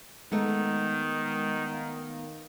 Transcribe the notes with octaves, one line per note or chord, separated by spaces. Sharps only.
D#3 G#3 A3 B3 D#4
F5